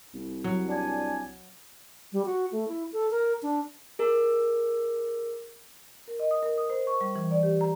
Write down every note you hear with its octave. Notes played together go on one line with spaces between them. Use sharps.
C2
F#3
D4 D5 G#5
G3
F#4
A3
E4
A4
A#4
D4
G#4 A#4
A#4
D#5
D#6
A#4
D#6
C5
C#6
G3
E3
D5
G4
A#5